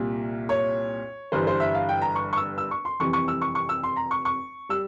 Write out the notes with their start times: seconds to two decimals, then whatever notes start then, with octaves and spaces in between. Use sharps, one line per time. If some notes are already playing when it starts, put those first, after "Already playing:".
Already playing: C2 A#2 G3
0.49 C#5
1.32 G1 G2 E3 G3 C5
1.47 C5
1.60 E5
1.75 F5
1.89 G5
2.02 A#5
2.16 C#6
2.33 C#6
2.37 E6
2.58 E6
2.71 C#6
2.85 C6
3.00 F1 F2 E3 G3 C#6
3.13 C#6
3.28 E6
3.42 C#6
3.55 C#6
3.69 E6
3.83 C6
3.96 A#5
4.11 C#6
4.25 C#6
4.69 G3 E6